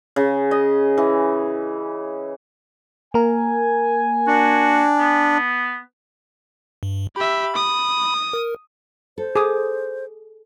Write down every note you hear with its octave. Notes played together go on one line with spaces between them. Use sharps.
C#3
D#5
E3
A#3 A#4 G#5
D4 F#4
B3
G2
G4 E5 B5
D#6
A#4
A4 C5
G#4 D6 D#6